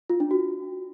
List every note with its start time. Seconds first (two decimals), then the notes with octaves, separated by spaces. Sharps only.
0.10 F4
0.20 D4
0.31 F#4